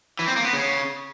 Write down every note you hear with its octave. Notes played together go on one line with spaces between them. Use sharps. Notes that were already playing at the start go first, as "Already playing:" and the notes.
E3
C4
A#3
B3
C#3